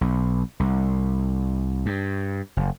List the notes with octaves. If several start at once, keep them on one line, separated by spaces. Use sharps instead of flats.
B1
C2
G2
F#1